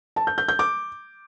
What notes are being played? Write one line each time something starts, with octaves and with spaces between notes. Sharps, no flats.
A5
G6
G6
G6
D6